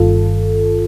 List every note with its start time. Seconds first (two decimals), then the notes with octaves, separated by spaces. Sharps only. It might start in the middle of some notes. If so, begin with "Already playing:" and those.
Already playing: G1 G2 D#3 F4 A4